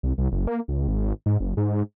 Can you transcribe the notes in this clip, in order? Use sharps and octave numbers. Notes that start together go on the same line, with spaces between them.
C2
C2
F#1
A#3
C#2
G#1
G#2
F#1
G#2